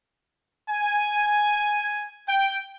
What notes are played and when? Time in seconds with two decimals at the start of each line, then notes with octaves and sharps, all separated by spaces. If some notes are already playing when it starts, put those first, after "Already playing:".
0.69 G#5
2.28 G5